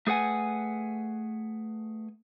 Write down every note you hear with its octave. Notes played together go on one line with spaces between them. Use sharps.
A3 G#4 B4 F#5 G#5